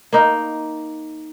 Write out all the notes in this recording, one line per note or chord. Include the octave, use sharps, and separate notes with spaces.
A#3 D#4